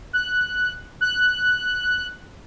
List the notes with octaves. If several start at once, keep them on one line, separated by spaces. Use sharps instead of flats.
F#6
F#6